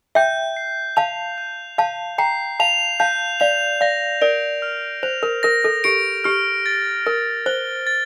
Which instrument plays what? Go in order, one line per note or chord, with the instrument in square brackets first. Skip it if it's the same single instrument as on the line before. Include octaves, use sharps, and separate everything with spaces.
[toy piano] E5 G5 [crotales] G6
[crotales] C7
[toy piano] F5 A5 [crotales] F7
[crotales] G6
[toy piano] F5 A5 [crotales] G6
[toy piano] G5 A#5 [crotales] C7
[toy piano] F5 A5 [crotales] F7
[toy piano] F5 A5 [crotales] G6
[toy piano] D5 F5 [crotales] F7
[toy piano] D5 F5 [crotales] A#6
[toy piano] A#4 D5 [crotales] D7
[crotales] F6
[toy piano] C5 [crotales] F7
[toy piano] A#4
[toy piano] A#4 [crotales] A#6
[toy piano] A4
[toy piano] G4 [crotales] D7
[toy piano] G4 [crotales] F6
[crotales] A6
[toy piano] A#4 [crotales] D7
[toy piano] C5 [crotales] G7
[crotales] A6